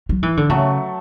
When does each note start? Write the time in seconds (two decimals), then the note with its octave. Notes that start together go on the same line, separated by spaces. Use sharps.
0.09 F#3
0.23 E3
0.37 D3
0.49 C#3 F#3 A3